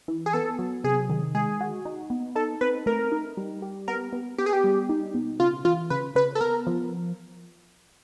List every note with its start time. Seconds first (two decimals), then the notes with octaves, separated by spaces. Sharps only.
0.08 E3
0.26 G#4
0.33 B3 A4
0.59 F#3
0.84 C3 G#4
1.10 D#3
1.35 G#3 G#4
1.61 F#4
1.85 D#4
2.10 B3
2.35 D#4 A4
2.61 C4 B4
2.86 A3 A#4
3.12 D#4
3.37 G3
3.62 G4
3.88 B3 A#4
4.13 B3
4.38 B3 G4
4.46 G#4
4.53 G4
4.64 G3
4.89 D#4
5.14 B2
5.40 C#3 F4
5.65 E3 F4
5.90 C#3 B4
6.15 C#3 B4
6.35 A4
6.40 B3 A#4
6.67 F3